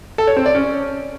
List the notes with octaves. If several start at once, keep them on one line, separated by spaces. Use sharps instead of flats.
A4
C#5
C4
D5
C#4